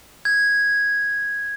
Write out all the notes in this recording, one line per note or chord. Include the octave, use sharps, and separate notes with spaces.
G#6